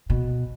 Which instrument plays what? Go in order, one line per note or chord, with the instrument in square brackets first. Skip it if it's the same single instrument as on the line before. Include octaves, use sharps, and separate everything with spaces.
[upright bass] B2